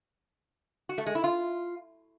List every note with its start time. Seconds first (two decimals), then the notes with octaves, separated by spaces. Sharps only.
0.89 F#4
0.98 A3
1.06 G#3
1.15 E4
1.24 F4